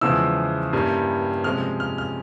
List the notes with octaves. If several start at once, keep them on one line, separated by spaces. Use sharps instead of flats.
E2 C#3 F3 G#3 E4 E6
G2 G3 A#3 C#4 E4
C3 F3 G#3 C#4 F6
F6
F6